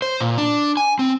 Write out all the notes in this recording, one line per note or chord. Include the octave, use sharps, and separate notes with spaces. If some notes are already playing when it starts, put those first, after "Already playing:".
C5
A#2
D4
G#5
C4